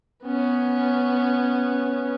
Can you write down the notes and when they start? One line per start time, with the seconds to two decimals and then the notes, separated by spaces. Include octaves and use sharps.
0.24 B3 C#4